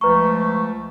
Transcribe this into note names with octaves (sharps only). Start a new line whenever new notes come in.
C#2 F3 A3 B4 A#5 C#6